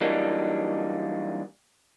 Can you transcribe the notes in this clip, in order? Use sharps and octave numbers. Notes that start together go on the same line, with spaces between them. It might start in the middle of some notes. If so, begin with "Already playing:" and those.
E3 F#3 G3 A#3 D4 D#4